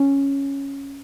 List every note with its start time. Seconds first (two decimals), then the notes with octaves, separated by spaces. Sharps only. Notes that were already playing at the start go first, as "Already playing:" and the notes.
Already playing: C#4